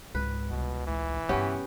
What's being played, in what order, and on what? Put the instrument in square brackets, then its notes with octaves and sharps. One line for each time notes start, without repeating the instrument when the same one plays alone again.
[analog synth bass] C#2 [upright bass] G#2 [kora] B4
[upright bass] C2 [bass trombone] B2
[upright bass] A1 E2 [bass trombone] E3
[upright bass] G2 C3 [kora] B3 C#4 G4